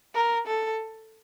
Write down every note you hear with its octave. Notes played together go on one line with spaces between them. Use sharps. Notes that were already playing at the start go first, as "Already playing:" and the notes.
A#4
A4